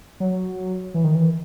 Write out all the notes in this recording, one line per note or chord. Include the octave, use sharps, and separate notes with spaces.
F#3
E3
D#3
E3